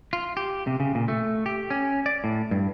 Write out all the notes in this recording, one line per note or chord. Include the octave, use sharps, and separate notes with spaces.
F4
G4
C3
C#3
A#2
A3
G4
C#4
D5
A2
G2